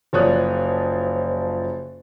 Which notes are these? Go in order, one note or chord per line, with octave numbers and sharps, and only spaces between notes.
F#1 F3 C#5 D5 D#6 F#6